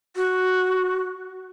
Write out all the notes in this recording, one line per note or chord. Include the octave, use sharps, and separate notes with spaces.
F#4